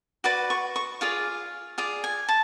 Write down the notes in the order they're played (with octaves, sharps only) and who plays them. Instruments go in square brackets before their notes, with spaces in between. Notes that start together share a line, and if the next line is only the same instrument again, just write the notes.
[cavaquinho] F#4 B4 D5 D6
C#6
C#6
F4 G#4 D5 F5
F4 G#4 D5
G#5
A5